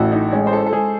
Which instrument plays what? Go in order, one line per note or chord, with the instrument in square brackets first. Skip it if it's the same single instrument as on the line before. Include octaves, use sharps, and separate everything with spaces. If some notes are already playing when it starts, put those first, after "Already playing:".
Already playing: [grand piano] A1 [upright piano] E4 F#4 A4
[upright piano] D#4
[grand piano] G#3 [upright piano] C#4
[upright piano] C5
A4
A4
[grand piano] G#3 [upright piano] G#4